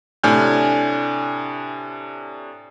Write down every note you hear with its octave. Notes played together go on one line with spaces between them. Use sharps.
A2 C3 D4 G#5 F6 G6